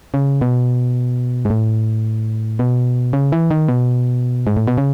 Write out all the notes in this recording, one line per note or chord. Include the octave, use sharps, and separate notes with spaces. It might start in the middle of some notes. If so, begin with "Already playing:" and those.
C#3
B2
G#2
A2
B2
C#3
E3
D#3
B2
G#2
A2
B2
C#3